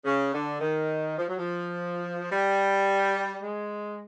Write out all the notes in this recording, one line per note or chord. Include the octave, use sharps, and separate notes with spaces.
C#3
D3
D#3
F3
F#3
F3
G3
G#3